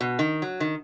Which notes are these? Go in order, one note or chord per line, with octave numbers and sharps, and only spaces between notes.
B2
D#3
F#3
D#3